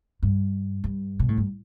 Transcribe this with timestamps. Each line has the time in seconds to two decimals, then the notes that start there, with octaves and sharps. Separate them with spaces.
0.23 G2
0.84 G2
1.19 B2
1.29 A2
1.37 G2